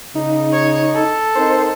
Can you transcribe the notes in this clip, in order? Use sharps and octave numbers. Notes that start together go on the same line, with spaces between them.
C#3 D#4
C#5
A4
C4 D#4 A#4 C5